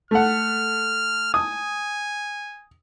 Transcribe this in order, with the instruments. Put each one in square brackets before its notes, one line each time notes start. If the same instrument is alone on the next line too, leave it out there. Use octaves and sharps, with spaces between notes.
[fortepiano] A3 F#5 [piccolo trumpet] F6
[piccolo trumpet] G#5 [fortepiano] D#6